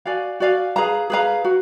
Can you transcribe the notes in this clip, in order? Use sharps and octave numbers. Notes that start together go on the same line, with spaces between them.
F#4 D5 F5 G#5
F#4 D5 F5 G#5
G#4 B4 F5 A#5
G#4 B4 F5 A#5
F#4